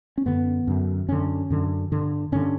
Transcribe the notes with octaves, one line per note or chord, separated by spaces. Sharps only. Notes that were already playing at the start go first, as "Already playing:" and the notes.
C#4
F#2 D3 B3
F#2 D3
F#2 D3 C#4
F#2 D3
G2 D3
G2 D3 C#4